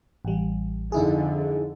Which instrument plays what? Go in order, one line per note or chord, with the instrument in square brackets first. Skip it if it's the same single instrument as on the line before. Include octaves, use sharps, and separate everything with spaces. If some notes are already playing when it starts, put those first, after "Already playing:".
[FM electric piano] A1 G3
[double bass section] F2 D3 [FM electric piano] D#4 E4 G#4